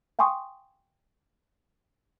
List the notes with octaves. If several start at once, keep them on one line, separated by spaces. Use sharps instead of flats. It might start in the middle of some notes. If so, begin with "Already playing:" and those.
F5 G5 G#5 C6 C#6 D#6